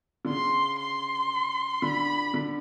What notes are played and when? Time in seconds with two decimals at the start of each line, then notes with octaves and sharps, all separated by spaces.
0.25 D3
0.29 C#3 C6
0.80 C6
1.82 D3 B5
2.34 D3